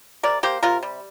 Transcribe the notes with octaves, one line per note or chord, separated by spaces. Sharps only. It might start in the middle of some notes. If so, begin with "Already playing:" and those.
C3 A#4 D5
A#3 G4 C5
C3 F4 A#4
G3